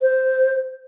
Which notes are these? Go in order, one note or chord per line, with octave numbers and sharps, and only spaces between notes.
C5